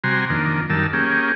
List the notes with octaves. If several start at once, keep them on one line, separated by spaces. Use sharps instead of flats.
C3 G3 F#4 G#5 A#5 C6
F2 D#3 A#3 D4
F#2 D#3 G3 A#4 A5 E6
A#3 C#4 G4 G#4